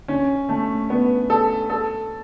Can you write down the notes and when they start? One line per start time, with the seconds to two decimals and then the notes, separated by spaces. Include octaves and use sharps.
0.08 C#4
0.49 A3
0.90 B3
1.30 A4
1.70 A4